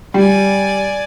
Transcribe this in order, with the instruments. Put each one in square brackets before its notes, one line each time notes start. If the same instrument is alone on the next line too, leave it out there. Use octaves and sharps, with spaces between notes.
[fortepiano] G3 [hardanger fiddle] D5 G#5